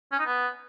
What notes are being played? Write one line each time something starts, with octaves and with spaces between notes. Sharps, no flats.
C#4
D#4
B3